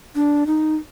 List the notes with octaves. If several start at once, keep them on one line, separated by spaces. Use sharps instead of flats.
D4
D#4